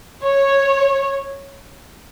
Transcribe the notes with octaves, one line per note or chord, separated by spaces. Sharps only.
C#5